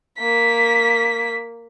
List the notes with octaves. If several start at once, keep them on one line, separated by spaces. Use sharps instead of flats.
A#3 B6